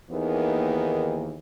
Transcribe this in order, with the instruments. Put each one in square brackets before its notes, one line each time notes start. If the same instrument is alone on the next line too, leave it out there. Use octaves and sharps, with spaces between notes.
[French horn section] D#2 D#3 E3 A#3 B3 G#4